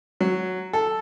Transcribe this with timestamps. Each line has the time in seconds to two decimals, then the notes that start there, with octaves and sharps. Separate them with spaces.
0.21 F#3
0.73 A4